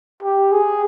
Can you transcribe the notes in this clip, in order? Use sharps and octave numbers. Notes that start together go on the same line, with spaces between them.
G4
G#4